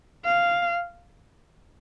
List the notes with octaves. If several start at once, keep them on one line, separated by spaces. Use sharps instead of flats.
F5